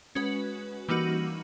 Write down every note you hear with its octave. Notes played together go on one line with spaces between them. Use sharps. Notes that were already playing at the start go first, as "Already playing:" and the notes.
G#3 C#4 F#4 B4
E3 G3 A#3 D#4 F#4